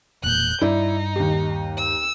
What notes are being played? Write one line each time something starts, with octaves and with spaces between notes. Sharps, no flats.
E1 A#2 F#6 G6
G2 D#4 E4 D5
D#2 G4
E6